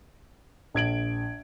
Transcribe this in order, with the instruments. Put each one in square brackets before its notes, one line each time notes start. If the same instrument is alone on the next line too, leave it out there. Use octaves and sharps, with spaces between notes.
[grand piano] A#1 G#6 D7 F#7